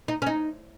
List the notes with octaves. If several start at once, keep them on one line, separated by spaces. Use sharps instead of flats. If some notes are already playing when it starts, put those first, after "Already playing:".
D#4
C#4
D#4